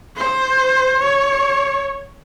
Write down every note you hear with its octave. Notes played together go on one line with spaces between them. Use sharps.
C5
C#5